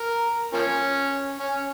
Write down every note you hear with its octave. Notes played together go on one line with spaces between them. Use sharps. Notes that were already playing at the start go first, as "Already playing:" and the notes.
Already playing: A#4
F3 A#3 C#4
C#4